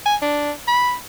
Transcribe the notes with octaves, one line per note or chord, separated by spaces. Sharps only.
G#5
D4
B5